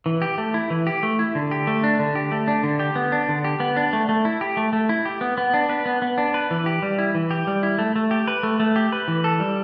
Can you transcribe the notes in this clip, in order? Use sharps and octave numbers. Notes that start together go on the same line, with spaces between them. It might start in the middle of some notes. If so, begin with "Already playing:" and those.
E3
G4
A3
E4
E3
G4
A3
E4
D3
G4
A3
D4
D3
G4
A3
D4
D3
G4
B3
D4
D3
G4
B3
D4
A3
A3
E4
G4
A3
A3
E4
G4
B3
B3
D4
B4
B3
B3
D4
B4
E3
G4
G3
E4
E3
G4
G3
E4
A3
A3
G4
B4
A3
A3
G4
B4
E3
A4
G3